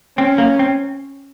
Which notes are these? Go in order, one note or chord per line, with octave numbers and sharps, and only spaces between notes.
C4 C#4
A#3
C4